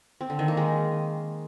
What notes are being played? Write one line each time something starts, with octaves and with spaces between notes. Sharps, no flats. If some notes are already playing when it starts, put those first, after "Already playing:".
C4
D3
D#3
A#3
G#3